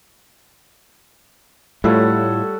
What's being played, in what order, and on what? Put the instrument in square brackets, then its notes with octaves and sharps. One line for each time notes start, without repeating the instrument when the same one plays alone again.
[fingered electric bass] A2 [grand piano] G3 C#5 [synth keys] A3 F4 [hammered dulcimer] A4 F#5